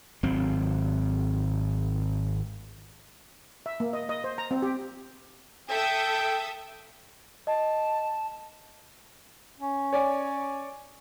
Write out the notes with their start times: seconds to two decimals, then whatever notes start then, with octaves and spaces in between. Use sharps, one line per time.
0.23 G#1 F#3 C4
3.66 E5
3.80 A#3
3.93 D#5
4.09 D#5
4.24 C5
4.38 A#5
4.51 C4
4.62 G4
5.70 A4 E5 G5 D#6
7.47 D#5 A5
9.60 C#4
9.93 C#5 D5 G#5